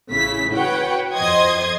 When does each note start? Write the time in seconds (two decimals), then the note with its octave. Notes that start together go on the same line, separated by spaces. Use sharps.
0.11 A1 C#3 E4 B6
0.54 F#4 B4 C#5 F#5 G5
1.14 F2 C5 D#5 C6 D#6 G#6